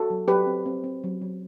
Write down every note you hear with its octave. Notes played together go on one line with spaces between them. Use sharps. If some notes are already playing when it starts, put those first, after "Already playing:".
Already playing: F#4 A4
F#3
F#3 G4 B4
C4
C4
C4
F#3
F#3